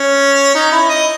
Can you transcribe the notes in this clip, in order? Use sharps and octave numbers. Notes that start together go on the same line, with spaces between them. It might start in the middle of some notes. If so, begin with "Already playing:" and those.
Already playing: C#4
D#4
E4
D#5